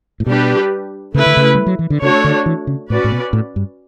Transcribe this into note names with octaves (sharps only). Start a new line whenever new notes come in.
A2
B2 G3 D4 G4 B4
C#3 A3 E4 B4
D3
C#3
G3
F#3
E3
D3
C#3 A3 D4 F#4 A4 C#5
D3
E3
C#3
A2 C#4 F#4 B4 D5
A2
B2
A2
G2